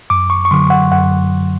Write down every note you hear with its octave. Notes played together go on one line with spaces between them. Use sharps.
F#2 D6
C#6
C#6
D3 F#3 C6
F#5
F#2 F#5